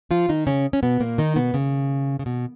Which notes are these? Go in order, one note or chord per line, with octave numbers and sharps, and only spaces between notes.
F3 F4
D#3 D#4
C#3 C#4
C#4
B2 B3
A#2 A#3
D#3 D#4
B2 B3
C#3
C#3
B2